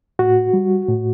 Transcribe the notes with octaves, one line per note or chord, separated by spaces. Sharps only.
A2 F#4
G3
A2